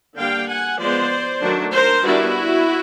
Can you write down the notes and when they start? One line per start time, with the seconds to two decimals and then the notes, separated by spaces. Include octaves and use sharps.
0.17 D3 G3 A#3 D4 F5 G5
0.48 F#5 G#5
0.79 F3 G#3 B3 C5 D5
1.41 D#3 F#3 A3 D4
1.72 A#4 C5
2.03 D#3 G3 B3 D4 E4 F#4